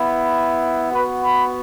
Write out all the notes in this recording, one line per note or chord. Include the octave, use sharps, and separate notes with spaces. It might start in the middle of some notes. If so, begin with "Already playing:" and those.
Already playing: B3 E4
B3 F#4 B4
B5